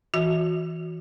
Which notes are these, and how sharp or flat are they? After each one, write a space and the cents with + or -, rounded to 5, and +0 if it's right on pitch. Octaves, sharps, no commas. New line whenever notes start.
E3 -10 F#4 -20 E5 -45